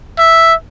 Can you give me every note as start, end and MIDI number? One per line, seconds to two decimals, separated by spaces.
0.19 0.54 76